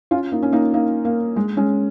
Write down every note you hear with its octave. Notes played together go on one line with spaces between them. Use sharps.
C#4 F4
A#3 D#4
C#4
A#3 D#4
A#3 D#4
A#3
G#3
G#3 C#4